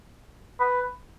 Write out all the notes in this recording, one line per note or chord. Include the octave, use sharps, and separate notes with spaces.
B4